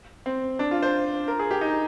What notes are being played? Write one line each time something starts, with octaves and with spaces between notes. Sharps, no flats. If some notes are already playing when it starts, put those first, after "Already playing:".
C4
D4
F4
C5
A#4
G#4
G4
D#4